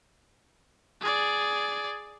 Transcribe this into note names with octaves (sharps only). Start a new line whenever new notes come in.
G#4 D5